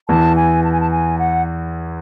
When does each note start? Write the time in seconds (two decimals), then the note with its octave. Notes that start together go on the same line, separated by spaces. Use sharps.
0.09 E2 E3 A5
0.36 G#5
0.64 A5
0.72 G#5
0.81 A5
0.91 G#5
1.18 F#5